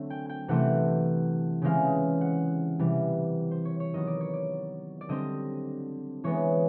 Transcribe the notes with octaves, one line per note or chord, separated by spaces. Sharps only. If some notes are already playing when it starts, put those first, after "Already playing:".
Already playing: D3 F#3 A3 C4
G5
G5
C3 E3 A3 C4 F#5
C#3 E3 G#3 C4 F5
F#5
C3 E3 G3
C5
C#5
C#5
D#3 F#3 B3 D#5
D5
C#5
D5
D5
D3 G3 C4 D#5
E3 G#3 B3 C#5